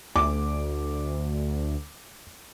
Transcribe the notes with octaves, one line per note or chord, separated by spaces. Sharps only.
D2 D6